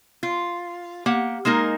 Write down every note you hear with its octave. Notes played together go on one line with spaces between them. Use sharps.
F4
A#3 G4 F#5
G#3 A#3 D#4 A#4